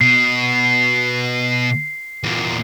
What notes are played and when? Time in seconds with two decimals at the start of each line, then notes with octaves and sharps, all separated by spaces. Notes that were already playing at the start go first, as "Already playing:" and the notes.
0.01 B2 C7
2.24 E2 A#2